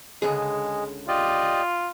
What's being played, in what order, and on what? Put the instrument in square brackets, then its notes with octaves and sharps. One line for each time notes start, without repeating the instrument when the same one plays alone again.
[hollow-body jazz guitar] C#2 D3 G#4 [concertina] G#3
[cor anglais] F4 [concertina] G4 D5 D#5